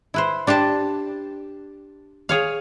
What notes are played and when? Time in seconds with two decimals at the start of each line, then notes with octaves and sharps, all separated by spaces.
0.14 E4 B4 C5
0.47 D4 G4 C5 A5
2.29 G#4 C#5 F5